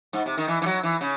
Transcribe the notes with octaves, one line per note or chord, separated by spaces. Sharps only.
G#2
C3
D#3
E3
E3
F#3
E3
C#3